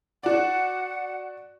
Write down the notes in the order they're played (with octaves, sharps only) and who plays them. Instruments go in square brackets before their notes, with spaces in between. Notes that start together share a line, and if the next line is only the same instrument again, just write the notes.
[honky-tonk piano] F#4 D5 [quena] F#5